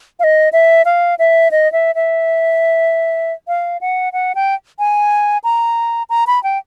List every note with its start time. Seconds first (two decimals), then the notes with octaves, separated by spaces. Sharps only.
0.19 F5
0.24 D#5
0.53 E5
0.85 F5
1.19 E5
1.51 D#5
1.72 E5
1.95 E5
3.48 F5
3.81 F#5
4.13 F#5
4.35 G5
4.79 G#5
5.44 A#5
6.10 A#5
6.27 B5
6.43 G5